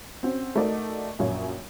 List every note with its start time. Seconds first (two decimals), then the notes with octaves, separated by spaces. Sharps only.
0.23 C4 C#4 F#4
0.55 A3 D#4 F#4 A#4 D5 D#5
1.19 A#1 F#2 C#5 E5